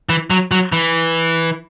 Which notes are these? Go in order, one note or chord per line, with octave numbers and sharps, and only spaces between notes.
E3
F#3
F#3
E3